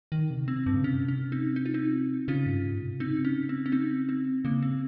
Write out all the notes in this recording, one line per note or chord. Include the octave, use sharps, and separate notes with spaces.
D#3
C3
C4
G2
C#3
C3 C#4
C#4
C4 D#4
D#4
F4
C4 D#4
C#3 C#4 F4
G2
G#2
C3
C#3 C4 D#4
C#4
C4
C#4
C4 D#4
C4
C#3 A#3
C4